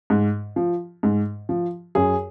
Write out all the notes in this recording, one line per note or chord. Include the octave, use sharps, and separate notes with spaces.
G#2
F3
G#2
F3
F#2 G#4